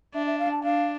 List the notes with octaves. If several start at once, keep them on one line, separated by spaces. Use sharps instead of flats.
D4 E5
E5
F5
A5
D4 F5